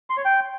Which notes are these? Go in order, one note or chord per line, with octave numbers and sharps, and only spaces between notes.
C6
C#5
G5